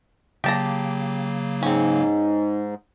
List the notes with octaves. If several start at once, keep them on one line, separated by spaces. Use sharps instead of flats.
C#3 F#3 A#3 G4 A5 A#5
G#2 C4 C#4 D#4